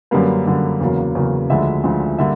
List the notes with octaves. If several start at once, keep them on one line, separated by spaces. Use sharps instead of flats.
F#2 D3 G3 A#3 B4
F#2 D3 G3 A#3
E2 C#3 F#3 A#3
E2 C#3 F#3 A#3
D2 D3 F3 G#3 E5
D2 D3 F3 G#3
D3 G3 A#3 E5